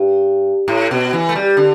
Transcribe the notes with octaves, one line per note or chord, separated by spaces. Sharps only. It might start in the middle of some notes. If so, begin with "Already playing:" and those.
Already playing: G2
A2
B2
E3
A3
G3
D3